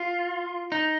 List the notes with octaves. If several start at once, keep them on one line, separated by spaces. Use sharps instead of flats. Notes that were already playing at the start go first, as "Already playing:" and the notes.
Already playing: F4
D#4